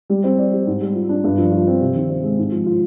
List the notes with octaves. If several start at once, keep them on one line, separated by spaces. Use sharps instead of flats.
G3
C4
D5
G4
G#2
G3
F4
D4
G2
F3
F4
C4
C3
D#3
C4
G#3
G#2
F3
F4